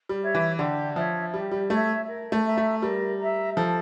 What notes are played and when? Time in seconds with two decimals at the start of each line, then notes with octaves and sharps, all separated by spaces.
0.09 G3
0.22 C#5 E5
0.35 E3
0.59 D3 G4
0.96 F3 C#5 E5
1.34 G3 G4
1.52 G3
1.70 A3 C#5 E5
2.08 A#4
2.32 A3
2.44 E5 A#5
2.58 A3
2.82 G3 A#4
3.20 E5 A#5
3.57 F3 A4